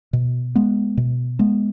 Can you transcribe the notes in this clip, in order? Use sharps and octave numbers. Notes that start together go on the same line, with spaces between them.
B2
G#3 B3
B2
G#3 B3